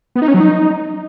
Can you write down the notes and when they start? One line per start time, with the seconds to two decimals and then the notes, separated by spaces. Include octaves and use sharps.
0.16 B3
0.22 D#4
0.28 C#4
0.34 F#3
0.40 D#4